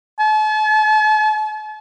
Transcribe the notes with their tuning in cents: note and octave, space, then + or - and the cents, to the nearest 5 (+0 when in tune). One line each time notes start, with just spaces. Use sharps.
A5 -45